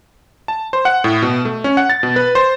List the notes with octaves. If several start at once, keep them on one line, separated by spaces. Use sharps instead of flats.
A5
C5
F#5
A2
B2
A3
C#4
F#5
A6
B2
B4
C5